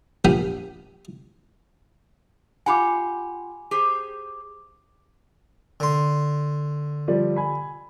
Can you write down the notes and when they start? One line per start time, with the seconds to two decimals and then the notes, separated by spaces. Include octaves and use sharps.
0.25 A#1 F3 G4 G5 G#5 B5
2.66 F4 G4 F#5 G#5 B5 D6
3.71 G4 G#4 C5
5.80 D3 C6
7.08 F3 G3 D5
7.36 G#5 B5